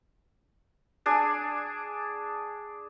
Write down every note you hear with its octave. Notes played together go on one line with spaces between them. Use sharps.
D4 G#4 G#5